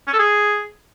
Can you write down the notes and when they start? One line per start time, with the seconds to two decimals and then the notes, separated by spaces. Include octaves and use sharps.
0.07 C#4
0.13 A4
0.19 G#4